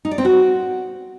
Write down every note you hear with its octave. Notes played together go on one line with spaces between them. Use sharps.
D#4
D5
C4
F#4